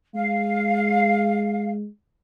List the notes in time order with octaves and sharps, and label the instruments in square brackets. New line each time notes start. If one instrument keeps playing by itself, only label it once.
[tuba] G#3 [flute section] F5